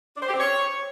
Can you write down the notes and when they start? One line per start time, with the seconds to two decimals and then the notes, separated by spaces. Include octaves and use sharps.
0.17 D4
0.23 C5
0.28 G4
0.34 C4
0.40 C#5